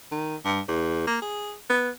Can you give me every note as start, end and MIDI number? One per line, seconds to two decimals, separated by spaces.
0.12 0.36 51
0.45 0.60 43
0.68 1.06 40
1.07 1.19 58
1.22 1.53 68
1.70 1.90 59